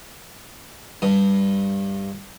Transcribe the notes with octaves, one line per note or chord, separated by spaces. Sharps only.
G2